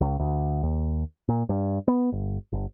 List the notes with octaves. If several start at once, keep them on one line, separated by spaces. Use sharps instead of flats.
C#2
D2
D#2
A#2
G2
B3
G1
G1